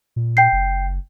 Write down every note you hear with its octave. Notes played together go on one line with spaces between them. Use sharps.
A#2
G5 G6 C7
F#1